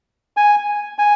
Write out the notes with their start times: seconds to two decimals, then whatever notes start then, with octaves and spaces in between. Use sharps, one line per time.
0.37 G#5
0.99 G#5